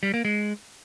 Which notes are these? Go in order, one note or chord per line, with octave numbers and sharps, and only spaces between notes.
G3
A#3
G#3